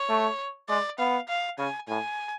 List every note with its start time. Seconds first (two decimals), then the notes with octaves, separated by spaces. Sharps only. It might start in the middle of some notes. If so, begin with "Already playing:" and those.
Already playing: C#5
0.09 A3
0.69 G#3 D5
0.99 B3 F5
1.28 F5
1.58 C#3 G#5
1.88 A2 G#5